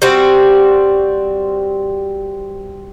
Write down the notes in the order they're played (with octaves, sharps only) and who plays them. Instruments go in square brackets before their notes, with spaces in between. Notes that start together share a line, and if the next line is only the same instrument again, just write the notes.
[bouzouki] G3 C4 F#4